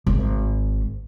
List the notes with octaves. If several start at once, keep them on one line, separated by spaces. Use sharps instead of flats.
G#1